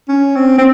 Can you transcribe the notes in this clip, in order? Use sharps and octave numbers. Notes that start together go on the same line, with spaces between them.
C#4
C4
C4